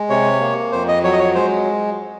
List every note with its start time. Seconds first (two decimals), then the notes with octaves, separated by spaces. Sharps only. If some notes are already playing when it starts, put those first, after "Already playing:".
Already playing: G#3
0.10 C3 C#5
0.41 A#3
0.72 F2 C5
0.88 D#5
1.03 F#3 C#5
1.13 D#5
1.19 C#5
1.35 G#3 C5